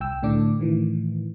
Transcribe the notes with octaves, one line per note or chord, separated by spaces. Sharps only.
C2 G5 E6
A2 D3 D4 D6
A2 D#3 E3